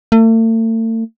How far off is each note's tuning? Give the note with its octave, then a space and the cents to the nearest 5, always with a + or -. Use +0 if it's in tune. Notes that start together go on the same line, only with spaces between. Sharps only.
A3 +40